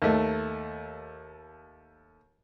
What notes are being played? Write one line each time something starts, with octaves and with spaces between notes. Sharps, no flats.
D#2 A3